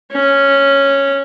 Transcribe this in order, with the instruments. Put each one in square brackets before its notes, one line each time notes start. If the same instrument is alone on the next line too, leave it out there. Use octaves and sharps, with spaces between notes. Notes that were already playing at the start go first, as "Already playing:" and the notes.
[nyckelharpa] C#4